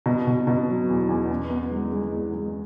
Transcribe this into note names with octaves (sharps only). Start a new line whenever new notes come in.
B2
B2
B2
F#3
E2
E2
B3
B3
G#3
G#3
E2
G#3